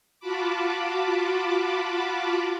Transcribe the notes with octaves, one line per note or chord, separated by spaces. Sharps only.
F4 F#4 A5 B5 D6